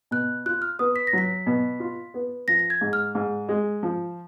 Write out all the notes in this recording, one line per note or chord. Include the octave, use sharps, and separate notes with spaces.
B2 F#6
F4 F#6
F6
B3 D#6
B6
A#6
F#3 B6
B2
F4
B3
F3 A#6
A#6
G#6
G#2
F6
G#2
G#3
F3